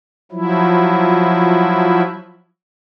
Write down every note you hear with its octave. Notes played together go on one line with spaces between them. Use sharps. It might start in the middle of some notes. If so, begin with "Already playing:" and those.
F3 F#3 E4